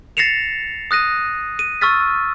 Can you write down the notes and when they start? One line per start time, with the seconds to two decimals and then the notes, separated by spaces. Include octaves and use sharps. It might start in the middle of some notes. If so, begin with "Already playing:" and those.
0.17 A6 A#6 C7 C#7 E7 F7
0.91 D#6 F#6 A#6 D#7
1.59 D#7
1.81 C#6 E6 F6 A6 B6